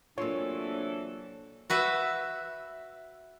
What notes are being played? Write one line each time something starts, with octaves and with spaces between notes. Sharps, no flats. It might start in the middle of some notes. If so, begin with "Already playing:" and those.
C3 E3 F#3 A#3 D4 F4 A4 C#5
F#4 B4 E5